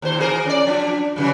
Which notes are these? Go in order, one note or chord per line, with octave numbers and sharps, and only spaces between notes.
D#2 A#2 C5
E3 G#4 A#4
C#4 D5
F3 D4
F#2 C#3 E3